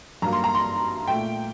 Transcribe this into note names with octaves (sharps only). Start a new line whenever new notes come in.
G2 F#3 A#3 A#5
C6
A#5
C6
A#2 A3 G5